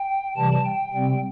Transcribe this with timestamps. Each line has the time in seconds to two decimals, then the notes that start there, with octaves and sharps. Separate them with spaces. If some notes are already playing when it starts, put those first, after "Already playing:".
Already playing: G5
0.37 C3 E3 G3 A5
0.65 G5
0.93 C3 G3 C4 G5